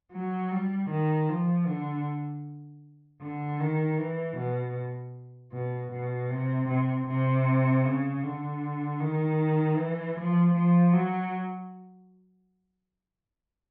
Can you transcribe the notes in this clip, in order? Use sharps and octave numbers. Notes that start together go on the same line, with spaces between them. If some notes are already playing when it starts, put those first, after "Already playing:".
F#3
G3
D#3
F3
D3
D3
D#3
E3
B2
B2
B2
C3
C3
C3
C#3
D3
D#3
E3
F3
F3
F#3